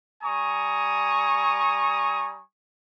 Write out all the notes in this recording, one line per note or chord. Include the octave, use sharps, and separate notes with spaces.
G3 G#5 A#5 C#6 D#6